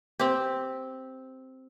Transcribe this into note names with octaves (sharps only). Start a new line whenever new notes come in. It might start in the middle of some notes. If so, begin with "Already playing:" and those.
C4 G4